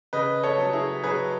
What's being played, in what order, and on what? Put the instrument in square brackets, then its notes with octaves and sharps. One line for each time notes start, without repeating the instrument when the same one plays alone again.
[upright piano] C#3 B4 D#5
A4 C#5
F#3
E4 G#4
F#3 G#4 B4